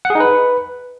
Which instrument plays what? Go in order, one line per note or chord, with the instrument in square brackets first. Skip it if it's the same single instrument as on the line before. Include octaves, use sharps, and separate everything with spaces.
[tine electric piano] F#5
G#4
D#4
B4